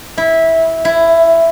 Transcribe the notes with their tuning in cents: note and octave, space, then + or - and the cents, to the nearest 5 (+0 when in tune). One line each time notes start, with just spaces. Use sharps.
E4 -15
E4 +10